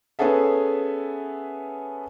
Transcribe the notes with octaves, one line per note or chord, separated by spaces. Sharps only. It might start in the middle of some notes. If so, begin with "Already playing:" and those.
B3 C#4 G#4 A4 E5